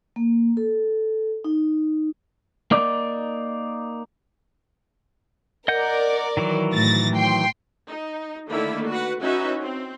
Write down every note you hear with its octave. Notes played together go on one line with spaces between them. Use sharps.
A#3
A4
D#4
A#3 D#4 D5
A#4 D5 D#5 F#5 G6
D#3 E3 F#3
A2 A6 A#6
G5 C6
D#4
D3 D#3 A3 A#3 E4 B5
F#4 B4 F#5
C#4 D#4 E4 F#4 B4 E5
C4